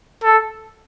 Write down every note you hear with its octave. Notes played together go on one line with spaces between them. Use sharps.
A4